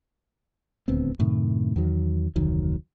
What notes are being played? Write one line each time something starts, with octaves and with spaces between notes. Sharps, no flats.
D#1 D2 B3 C4
F#2 A2 C3 D#3
E2 D#3 F#3
F1 D2 D#3 F#3